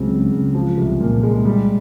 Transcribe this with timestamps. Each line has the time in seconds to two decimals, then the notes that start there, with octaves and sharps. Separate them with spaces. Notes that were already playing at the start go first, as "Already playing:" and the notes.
Already playing: C#2 F#3 C4
0.09 C#3
0.31 C#2
0.54 F3
0.78 C2
1.00 A#2
1.23 G#3
1.45 G3